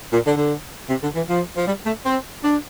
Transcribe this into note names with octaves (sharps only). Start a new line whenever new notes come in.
A#2
D3
D3
C3
D3
E3
F3
F3
G3
A3
C4
D4